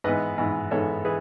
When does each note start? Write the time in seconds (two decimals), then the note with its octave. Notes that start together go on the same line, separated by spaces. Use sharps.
0.04 G#2 E3 B3 B4 D#5
0.38 G#2 E3 B3
0.71 G#2 E3 B3 A4 C#5
1.05 E3 G#4 B4